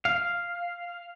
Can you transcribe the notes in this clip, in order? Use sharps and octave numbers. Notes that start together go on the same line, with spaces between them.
F5